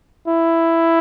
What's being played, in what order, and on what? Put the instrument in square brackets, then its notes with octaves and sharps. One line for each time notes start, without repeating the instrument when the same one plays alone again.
[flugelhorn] E4